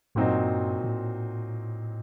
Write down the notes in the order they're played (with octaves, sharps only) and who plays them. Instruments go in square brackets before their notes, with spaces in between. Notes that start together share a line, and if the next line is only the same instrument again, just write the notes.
[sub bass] G2 [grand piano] A#2 F#3 C4 D#4 F#4
[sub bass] A2